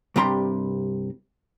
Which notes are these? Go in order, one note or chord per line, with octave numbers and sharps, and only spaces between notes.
C2 G2 C3 G3 A#5 C6